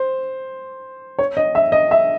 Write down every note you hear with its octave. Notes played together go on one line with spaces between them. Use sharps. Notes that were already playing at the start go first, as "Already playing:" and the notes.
Already playing: C5
C#5
D#5
E5
D#5
E5